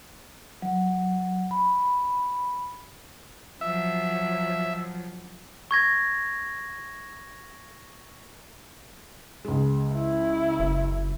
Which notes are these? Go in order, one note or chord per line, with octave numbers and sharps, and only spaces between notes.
F#3
B5
F3 F#3 E5
C#6 G#6 A#6
C#2 G#3
E4
F#1